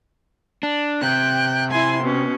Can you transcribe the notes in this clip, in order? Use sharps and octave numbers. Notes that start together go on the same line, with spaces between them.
D4
C3 G5 F#6
E4 G#5 C6
B2 C#4